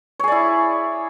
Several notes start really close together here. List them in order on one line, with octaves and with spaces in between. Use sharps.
C#5 G#4 D5 E4